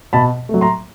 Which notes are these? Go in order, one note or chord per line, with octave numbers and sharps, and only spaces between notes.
B2 A5 B5
A3
F#3
A#5 C6